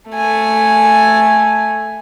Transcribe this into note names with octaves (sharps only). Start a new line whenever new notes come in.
A3 G#5